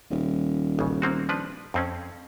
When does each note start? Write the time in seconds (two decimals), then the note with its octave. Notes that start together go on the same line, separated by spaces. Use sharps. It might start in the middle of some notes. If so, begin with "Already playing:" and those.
0.11 D#1
0.79 A1 C#3
1.02 A#3 C4 F#4
1.29 F3 D4 B4
1.74 F2 C4 C#4